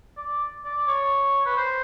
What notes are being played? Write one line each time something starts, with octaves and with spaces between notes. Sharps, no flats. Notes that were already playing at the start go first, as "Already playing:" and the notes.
D5
D5
C#5
B4
C5